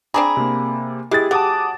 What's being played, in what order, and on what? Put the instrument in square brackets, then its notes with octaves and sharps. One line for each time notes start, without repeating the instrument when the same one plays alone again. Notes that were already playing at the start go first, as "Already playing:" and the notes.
[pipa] C4 D4 G#4 [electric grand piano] A#5 [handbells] B5 D6
[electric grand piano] C3 A#3
[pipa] G#3 [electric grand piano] E4 G#4 A6 [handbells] G4
[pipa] F#3 [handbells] G#4 A5 [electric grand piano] F#5 D6 D#6